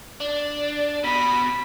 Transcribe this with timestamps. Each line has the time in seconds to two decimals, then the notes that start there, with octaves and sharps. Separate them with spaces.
0.20 D4
1.04 B2 B5